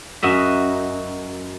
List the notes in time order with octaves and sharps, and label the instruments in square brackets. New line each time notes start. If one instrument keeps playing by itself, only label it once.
[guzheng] F#2 F#4 D#5 E5